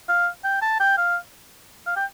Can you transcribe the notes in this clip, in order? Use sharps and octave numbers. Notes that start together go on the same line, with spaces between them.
F5
G5
A5
G5
F5
F5
G5